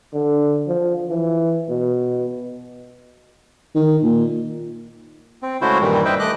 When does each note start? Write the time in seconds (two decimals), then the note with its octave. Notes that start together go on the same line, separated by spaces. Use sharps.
0.14 D3
0.68 F3
1.10 E3
1.69 B2
3.75 D#3
4.03 A#2
5.43 C4
5.62 C#3 G#3 A3 E4 F#4 C5
5.81 G2 A#2 D#3 E3 G3
6.05 B4 C5 D#5 E5 G5
6.19 A3 D#5 D6 F#6